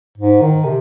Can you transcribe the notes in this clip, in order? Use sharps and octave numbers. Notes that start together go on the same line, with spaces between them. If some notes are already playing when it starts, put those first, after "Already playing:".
G#2
D#3
C3